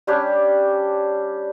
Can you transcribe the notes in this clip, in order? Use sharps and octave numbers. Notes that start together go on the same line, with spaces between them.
G3 C#4 D4 G4